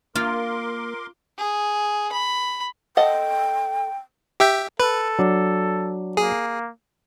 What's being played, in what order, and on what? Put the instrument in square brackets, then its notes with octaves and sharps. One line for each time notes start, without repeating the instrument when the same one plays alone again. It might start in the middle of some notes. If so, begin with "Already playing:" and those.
[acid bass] A#3 [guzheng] F4 [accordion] A#4 C6 D6
[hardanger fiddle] G#4
B5
[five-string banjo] A4 D#5 F#5 [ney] G5
[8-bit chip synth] G4 E5 G5
[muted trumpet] A4 [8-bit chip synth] B4
[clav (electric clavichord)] F#3 D4
[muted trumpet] A#3 [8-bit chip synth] G#4